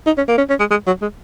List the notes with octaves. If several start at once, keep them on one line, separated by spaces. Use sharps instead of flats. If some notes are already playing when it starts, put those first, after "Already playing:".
D#4
C#4
A#3
C#4
C#4
G#3
G#3
F#3
G#3